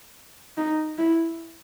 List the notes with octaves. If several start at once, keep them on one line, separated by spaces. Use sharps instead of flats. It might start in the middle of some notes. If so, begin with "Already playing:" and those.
D#4
E4